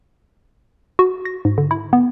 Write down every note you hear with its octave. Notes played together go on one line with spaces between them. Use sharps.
F#4
A#6
G#2
D3
E4
B3